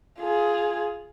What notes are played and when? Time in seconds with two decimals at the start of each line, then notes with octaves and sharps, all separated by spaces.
0.19 F4 G#4